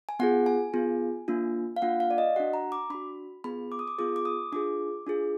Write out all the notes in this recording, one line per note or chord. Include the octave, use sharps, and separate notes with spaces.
G#5
B3 F4 G#4 F#5
G#5
B3 F4 G#4
A#3 D4 F4
F5
A#3 D4 F4 F#5
F5
D5
D#5
D4 F#4 F#5
A#5
D6
D4 F#4 B5
B3 F4 G#4 B5
D6
D#6
D6
B3 F4 G#4 D6
D6
D#6
D4 F4 G#4 D6
D4 F4 G#4